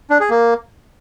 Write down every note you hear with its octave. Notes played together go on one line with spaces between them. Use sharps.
D4
G#4
A#3